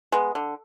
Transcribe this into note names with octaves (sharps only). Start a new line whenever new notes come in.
G#3 B3
D3